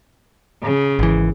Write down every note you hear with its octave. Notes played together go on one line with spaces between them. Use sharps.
C#3
G#1 E3